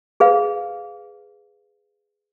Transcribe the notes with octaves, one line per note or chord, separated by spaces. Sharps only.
G#4 B4 F5